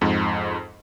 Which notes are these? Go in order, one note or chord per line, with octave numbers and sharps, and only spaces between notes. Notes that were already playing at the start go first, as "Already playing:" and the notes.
F2 G#2